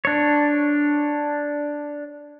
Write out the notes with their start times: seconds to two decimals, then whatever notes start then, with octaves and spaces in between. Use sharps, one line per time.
0.05 D4 C#5